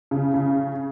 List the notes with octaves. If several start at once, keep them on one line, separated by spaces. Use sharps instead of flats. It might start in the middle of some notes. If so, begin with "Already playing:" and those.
C#3
C#3